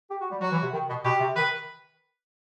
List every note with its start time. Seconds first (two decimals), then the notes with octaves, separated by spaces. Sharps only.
0.11 G4
0.21 F#4
0.31 G3
0.42 F#3 F#4
0.52 E3
0.62 C3
0.73 D#3
0.89 B2
1.04 B2 G4
1.20 C3
1.36 D#3 B4